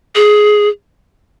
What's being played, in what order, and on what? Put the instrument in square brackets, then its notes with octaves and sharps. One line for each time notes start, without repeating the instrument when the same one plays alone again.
[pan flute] G#4